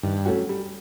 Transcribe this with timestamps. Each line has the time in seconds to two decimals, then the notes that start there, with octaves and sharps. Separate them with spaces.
0.03 G2 D#3
0.25 F#3 A3 C#4 F#4
0.49 G3